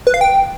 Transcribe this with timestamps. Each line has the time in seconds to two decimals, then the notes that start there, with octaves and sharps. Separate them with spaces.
0.07 B4
0.14 F5
0.21 G5